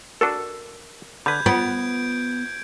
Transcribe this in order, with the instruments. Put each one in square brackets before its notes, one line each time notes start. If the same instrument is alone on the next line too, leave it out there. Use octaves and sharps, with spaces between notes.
[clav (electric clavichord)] D4 F#4 A4 [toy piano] A#4
[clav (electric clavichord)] D3 B4 [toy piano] B5 [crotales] G6 G#6
[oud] B3 [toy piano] F4 [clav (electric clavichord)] G5 [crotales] G#6 D7